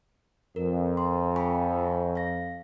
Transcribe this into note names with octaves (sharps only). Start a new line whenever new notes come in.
F2 A#4
C6
G#5 B5 C#6
F5 A#6